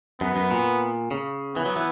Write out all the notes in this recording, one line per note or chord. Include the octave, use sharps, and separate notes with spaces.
F#2 B3
F#2
A#2
C#3
E3 B3
F#3
E3